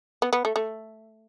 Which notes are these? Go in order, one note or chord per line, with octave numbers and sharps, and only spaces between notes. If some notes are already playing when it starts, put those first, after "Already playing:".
B3
B3
A3
A3